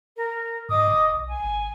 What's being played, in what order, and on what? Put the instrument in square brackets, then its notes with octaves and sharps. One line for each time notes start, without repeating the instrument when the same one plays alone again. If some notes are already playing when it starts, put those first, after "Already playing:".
[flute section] A#4
[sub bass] G#2 [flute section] D#5 D6 D#6
[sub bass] D#1
B1
[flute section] G#5
[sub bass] G#1